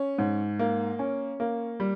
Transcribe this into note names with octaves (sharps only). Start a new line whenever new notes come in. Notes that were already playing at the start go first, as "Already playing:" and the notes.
Already playing: C#4
G#2
A#3
C#4
A#3
G3